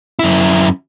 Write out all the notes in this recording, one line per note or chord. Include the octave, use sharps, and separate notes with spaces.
F#2 E4